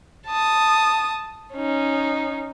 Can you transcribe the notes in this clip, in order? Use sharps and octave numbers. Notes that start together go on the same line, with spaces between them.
A5 D#6
C#4 D#4